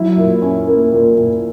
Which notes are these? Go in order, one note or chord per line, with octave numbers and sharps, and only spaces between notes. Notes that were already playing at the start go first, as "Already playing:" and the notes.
Already playing: F#3 E4
A#2
C#4
A#3
A#2
A#2